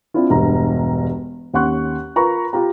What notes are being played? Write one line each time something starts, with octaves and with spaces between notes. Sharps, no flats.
C4 D4 E4 F4
E1 G2 A#5
D#2 C#4 F#5 C6 C#6 F#6
F4 A#4 B4 A#5 B5 C#6
F4 G4 A#5